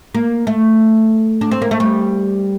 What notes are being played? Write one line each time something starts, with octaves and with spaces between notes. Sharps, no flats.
A#3
A3
D4
C4
A#3
A3
G3